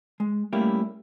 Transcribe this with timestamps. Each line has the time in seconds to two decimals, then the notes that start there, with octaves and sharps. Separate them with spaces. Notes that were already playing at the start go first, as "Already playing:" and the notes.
0.20 G#3
0.53 G3 A3 A#3 C#4 E4 G4